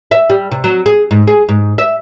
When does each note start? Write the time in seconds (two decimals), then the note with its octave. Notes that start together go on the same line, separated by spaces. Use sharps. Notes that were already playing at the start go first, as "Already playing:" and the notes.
0.11 E5
0.30 G3
0.51 C3
0.64 F#3
0.86 G#4
1.11 G#2
1.27 G#4
1.49 G#2
1.78 E5